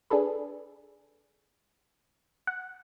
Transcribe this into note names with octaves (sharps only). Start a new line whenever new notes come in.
D4 G#4 A4 B4
F#5